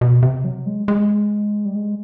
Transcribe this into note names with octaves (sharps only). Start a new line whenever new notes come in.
B2
C3
F#3
G#3
G#3
G3
G#3